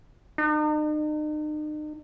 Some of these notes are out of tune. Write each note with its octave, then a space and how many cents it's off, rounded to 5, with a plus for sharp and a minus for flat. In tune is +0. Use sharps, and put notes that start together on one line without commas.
D#4 -40